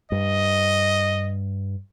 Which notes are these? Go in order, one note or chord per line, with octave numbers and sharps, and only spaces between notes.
G2 D#5